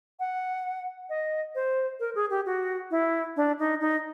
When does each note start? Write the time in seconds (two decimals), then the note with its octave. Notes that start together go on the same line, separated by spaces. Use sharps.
0.20 F#5
1.10 D#5
1.55 C5
2.00 A#4
2.15 G#4
2.30 G4
2.46 F#4
2.91 E4
3.36 D4
3.59 D#4
3.80 D#4